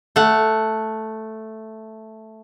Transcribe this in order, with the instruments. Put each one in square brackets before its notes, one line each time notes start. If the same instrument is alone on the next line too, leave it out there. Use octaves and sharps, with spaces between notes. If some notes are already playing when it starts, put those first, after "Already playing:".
[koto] A3 F#5